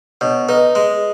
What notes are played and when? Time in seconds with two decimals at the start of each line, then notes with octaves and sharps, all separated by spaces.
0.21 B2 C#5
0.49 D#4 B4
0.75 G#3